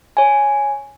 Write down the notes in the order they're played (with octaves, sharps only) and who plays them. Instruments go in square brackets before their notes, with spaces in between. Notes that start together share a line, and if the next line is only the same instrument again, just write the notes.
[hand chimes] C#5 G#5